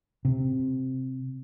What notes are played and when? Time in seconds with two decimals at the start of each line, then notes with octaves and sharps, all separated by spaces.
0.25 C3